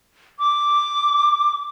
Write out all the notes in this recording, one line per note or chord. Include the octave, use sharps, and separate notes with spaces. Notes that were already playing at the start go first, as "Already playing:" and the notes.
D6